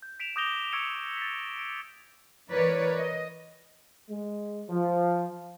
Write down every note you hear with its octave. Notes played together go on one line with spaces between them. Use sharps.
G6
B6 D7 E7 F7
D6 D#6 G6 A#6 F7 G7
C#6 D#6 E6 G#6 C#7 D7
A6 B6
D7
E3 A#4 B4 C#5 D5
D#5
G#3
F3